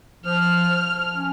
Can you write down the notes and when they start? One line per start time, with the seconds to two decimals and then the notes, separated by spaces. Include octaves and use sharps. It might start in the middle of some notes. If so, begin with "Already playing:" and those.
0.25 F3 F6
0.70 F3
1.15 C#4